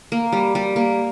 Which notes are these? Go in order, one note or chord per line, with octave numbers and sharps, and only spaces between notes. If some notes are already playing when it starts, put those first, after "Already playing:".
A#3
G3
G3
A#3